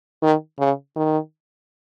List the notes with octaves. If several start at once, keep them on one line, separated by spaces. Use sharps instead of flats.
D#3
C#3
D#3